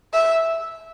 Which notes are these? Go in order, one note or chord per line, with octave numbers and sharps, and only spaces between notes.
E5